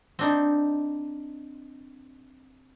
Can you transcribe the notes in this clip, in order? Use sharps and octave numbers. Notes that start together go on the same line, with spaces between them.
C4 D4 D#4